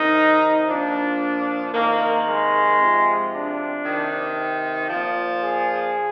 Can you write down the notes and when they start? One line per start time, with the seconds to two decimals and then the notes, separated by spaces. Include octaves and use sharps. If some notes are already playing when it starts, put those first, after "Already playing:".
Already playing: C3 D#3 D#4
0.69 A#2 F3 D4
1.74 C3 D#3 A#3
2.27 G#3
2.80 C3 F3
3.32 D4
3.85 C3 D#3
4.90 A#2 F3
5.42 G#4